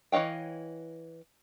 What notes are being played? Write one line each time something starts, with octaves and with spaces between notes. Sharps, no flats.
E3 C#5 D#5 F5 G5